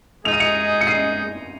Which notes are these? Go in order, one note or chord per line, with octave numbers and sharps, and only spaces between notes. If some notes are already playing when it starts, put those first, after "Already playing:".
G#3 D#4 G#4 F7
D#7
C#7 F7
C#7
C7 D#7